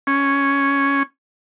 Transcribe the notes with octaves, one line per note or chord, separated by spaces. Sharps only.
C#4